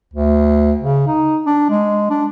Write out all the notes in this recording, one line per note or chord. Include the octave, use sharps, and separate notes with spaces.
D2
C#3
D#4
D4
G#3
D4